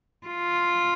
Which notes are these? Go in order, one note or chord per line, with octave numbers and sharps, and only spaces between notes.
F4